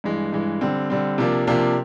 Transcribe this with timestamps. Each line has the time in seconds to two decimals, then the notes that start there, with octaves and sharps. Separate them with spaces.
0.04 G2 E3 G#3
0.33 G2 E3 G#3
0.61 D3 G3 C4
0.90 D3 G3 C4
1.18 C3 F3 A#3 D4
1.47 C3 F3 A#3 D4